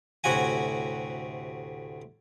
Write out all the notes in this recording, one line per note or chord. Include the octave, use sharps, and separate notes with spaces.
D2 A2 C3 F#4 F#5 G#5